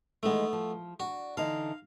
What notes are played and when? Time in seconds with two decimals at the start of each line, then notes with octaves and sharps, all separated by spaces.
0.23 D#3 E3 G#3 A3 B3
0.53 F3
1.00 D4 F#4
1.37 D3 E3 D#4 F5